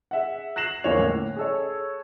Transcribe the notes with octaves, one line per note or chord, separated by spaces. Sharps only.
G#4 E5 F#5
F#6 A#6 C7 E7 F#7
E2 D3 F3 A#3 C#5 F7
A2
G#4 A4 C#5